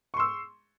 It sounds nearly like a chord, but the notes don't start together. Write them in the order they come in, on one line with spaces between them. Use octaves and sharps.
C#6 C6 E6